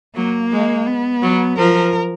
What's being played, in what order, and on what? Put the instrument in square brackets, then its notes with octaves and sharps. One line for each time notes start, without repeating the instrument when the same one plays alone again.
[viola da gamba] F#3 [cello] A#3
[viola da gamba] G#3
[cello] B3
[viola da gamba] F#3
[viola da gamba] F3 [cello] A#4